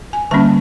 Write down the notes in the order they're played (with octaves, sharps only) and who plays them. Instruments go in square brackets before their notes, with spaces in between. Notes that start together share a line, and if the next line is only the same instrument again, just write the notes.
[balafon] G#5
D3 G3 A#3 C#4 A5